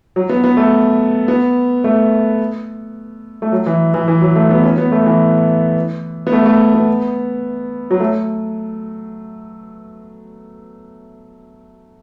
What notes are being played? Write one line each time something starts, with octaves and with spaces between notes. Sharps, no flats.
F#3
B3
B3
A3
B3
A3
A3
F#3
E3
E3
E3
F#3
A3
B3
C#4
B3
A3
E3
B3
A3
A3
B3
F#3
A3